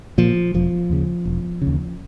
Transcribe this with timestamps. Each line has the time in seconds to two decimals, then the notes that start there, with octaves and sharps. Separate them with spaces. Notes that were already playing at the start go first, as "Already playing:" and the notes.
0.18 A#2 F3
0.54 E1 F3
0.89 D#2 C#3
1.25 E1
1.62 C#3
1.67 D#2